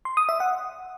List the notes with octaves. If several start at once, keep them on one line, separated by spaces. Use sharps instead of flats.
C6
D#6
E5
F#5